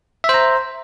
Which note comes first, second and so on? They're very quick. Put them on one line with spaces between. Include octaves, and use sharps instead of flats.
E5 C5 A#5